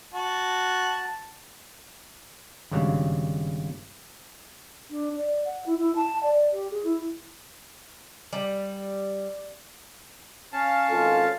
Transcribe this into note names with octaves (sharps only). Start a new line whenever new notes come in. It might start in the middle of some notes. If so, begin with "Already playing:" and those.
F#4 A5
G#1 G2 C#3 F#4
D4
D5
F#5
E4
E4
A5
D5
G4
G#4
E4
G3
C#4 F5 A5
G#1 F4 A4